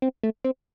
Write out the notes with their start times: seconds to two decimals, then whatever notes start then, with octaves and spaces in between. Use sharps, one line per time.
0.02 C4
0.23 A3
0.44 C4